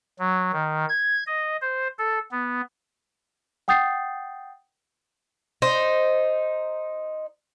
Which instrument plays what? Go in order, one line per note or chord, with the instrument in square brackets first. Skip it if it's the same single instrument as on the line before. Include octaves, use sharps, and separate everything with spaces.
[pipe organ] F#3
D#3
G#6
D#5
C5
A4
B3
[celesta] F#5 G5 D#6 G6 A6 C7
[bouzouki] D#4 C5